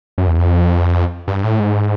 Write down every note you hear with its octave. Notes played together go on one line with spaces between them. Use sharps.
F#2
E2
F2
G2
A2
G#2